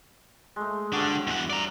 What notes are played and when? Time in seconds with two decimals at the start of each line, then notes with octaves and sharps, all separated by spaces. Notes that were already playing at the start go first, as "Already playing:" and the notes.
0.56 G#3 A3
0.93 G2 D3 D4 F#4
1.27 E2 F#5
1.50 D5 A#5